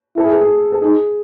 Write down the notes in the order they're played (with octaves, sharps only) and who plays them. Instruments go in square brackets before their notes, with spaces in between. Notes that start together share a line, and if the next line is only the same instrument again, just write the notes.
[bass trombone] E4 [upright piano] A4
[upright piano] G#4
A4
G#4
A4
[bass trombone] D#4 [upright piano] G#4